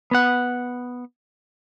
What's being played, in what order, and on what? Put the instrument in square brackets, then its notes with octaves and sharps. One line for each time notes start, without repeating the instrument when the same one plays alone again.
[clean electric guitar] B3 F#5